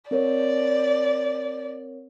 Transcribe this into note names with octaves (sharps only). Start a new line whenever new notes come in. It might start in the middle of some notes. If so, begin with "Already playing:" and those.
C4 A#4 C#5 D5